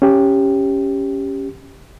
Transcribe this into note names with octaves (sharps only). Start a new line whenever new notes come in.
C#4 G4